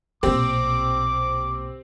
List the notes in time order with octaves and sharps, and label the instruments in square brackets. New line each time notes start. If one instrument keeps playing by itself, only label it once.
[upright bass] B1 A#2 [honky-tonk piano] C4 G4 [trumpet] D6